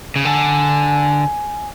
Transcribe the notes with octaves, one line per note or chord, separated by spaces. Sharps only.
C#3
D3 G#5